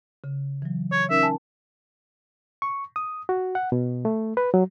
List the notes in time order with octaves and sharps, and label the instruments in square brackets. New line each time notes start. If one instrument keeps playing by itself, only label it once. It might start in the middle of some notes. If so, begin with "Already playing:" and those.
[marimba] C#3
E3 F#3
[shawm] C#5
[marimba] C#4 D#4 A#4 [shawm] E5
[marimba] G#5 A5
[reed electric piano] C#6
D#6
F#4
F#5
B2
A3
B4
F#3